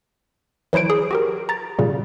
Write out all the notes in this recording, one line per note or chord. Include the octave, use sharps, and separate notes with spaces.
E3 F#3 E4 C5 D7
G#4
F#4 G4 A#4
A#5 A6
A#2 C#3 G3